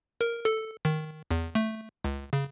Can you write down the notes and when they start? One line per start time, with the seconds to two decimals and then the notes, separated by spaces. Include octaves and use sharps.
0.21 A#4
0.45 A4
0.85 D#3
1.31 E2
1.55 A3
2.04 C#2
2.33 C#3